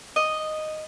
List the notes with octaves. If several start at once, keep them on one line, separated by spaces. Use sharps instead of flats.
D#5